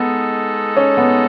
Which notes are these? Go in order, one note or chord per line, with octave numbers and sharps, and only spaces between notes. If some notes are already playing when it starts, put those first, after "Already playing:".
Already playing: G#3 B3 D#4 A4
C#4
B3